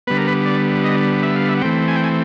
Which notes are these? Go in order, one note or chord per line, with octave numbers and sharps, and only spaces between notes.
D3 G3 B3 B4
A#4
B4
D5
D#5
E5
F5
E5
F#5
E3 A3 C4 G5
G#5
G5
G#5